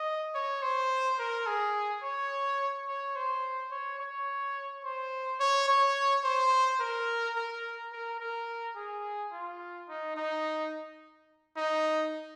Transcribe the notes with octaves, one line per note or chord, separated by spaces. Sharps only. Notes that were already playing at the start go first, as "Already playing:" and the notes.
Already playing: D#5
C#5
C5
A#4
G#4
C#5
C#5
C5
C#5
C#5
C5
C#5
C#5
C5
A#4
A#4
A#4
A#4
G#4
F4
D#4
D#4
D#4